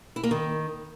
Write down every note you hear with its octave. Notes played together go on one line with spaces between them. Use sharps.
E4
A#3
D#3